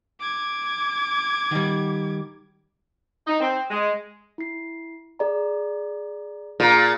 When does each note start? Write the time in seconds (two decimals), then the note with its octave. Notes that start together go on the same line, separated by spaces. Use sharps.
0.20 D6 G#6
1.51 D#3 G3
3.27 D#4
3.40 C4
3.70 G#3
4.38 E4 C7
5.19 G#4 D5 A#5
6.60 A#2 G#4